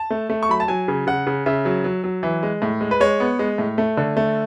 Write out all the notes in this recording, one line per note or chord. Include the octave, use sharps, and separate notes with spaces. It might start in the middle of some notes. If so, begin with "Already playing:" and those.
Already playing: A5
A3
A3
C#6
F#3 B5
A5
F#3 G#5
C#3
C#3 F#5
C#3
C#3 E5
F#3
F#3
F#3
E3
G#3
A2
G#3
B4
G#3 C#5
B3
G#3
A2
A3
D3
A3